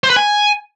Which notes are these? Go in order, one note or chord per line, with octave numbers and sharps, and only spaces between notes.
C5
B4
G#5